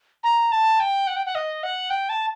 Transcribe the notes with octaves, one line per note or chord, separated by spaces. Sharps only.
A#5
A5
G5
F#5
G5
F#5
D#5
F#5
G5
A5